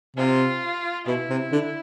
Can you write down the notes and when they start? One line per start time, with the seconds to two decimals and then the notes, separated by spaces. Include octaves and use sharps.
0.16 C3 F4
1.07 B2 E4
1.30 C3
1.52 D3